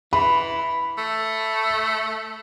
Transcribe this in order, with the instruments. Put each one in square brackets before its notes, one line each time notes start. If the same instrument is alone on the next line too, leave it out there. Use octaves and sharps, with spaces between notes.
[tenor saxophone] E3 [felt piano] B5
[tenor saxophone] A3